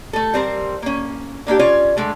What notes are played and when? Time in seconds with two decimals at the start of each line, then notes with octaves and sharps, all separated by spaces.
0.13 A3 A4
0.34 G3 C4 A#4 C5
0.82 A#3 C#4
1.47 D3 A#3 D4 G4
1.59 C#4 F4 C#5 D5
1.97 D3 G#3 A3